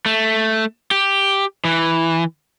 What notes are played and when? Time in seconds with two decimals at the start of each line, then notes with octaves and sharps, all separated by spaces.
0.06 A3
0.91 G4
1.65 E3